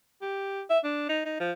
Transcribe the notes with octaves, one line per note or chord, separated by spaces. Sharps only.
G4
E5
D4
D#4
D#4
F3